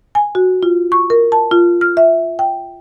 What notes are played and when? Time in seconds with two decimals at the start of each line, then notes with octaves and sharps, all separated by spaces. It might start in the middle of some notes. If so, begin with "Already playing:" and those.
0.15 G#5
0.35 F#4
0.63 F4
0.92 C#6
1.10 A#4
1.32 A5
1.51 F4
1.81 F6
1.97 E5
2.39 G5